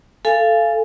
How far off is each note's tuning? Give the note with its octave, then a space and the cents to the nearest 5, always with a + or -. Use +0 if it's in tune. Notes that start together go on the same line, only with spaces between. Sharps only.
A4 +0 F5 -25 G#5 +0